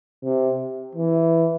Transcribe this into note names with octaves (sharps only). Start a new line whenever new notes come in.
C3
E3